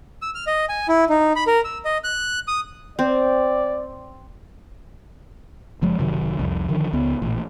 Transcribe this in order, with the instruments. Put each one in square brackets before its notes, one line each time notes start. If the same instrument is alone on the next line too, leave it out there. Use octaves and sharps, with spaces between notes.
[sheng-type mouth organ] E6
F6
D#5
G#5
E4
D#4
B5
A#4
E6
D#5
F#6
D#6
[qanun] C4 [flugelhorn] D5
[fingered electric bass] F#1 F3 G#3
F#1 C3 D#3 F#3
C2 F2
D3 D#3 F3
C#2 B3
A1 A#2